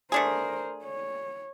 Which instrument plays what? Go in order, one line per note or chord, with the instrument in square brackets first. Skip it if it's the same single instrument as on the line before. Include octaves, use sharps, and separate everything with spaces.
[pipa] A3 D4 G#4 [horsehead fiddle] A#4 C5
[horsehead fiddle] C#5